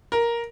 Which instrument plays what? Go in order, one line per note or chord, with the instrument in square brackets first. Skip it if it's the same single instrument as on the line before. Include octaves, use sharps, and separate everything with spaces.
[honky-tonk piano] A#4